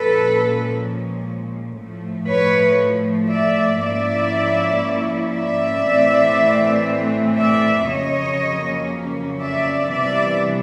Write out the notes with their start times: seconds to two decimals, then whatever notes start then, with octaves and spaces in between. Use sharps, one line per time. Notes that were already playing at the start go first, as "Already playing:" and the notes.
Already playing: A#2 F3 G#3 C#4 A4 B4
1.77 A2 F3 A3
2.28 B4 C#5
3.29 D5 E5
3.80 G#2 F3 A#3 C#4 E4 D5 E5
5.32 D5 E5
5.84 A2 E3 A3 C4
7.36 D5 E5
7.87 F2 C#3 F#3 A#3 C#4 C#5 D#5
9.40 D5 E5
9.91 C3 E3 G3 B3 D4 D5 E5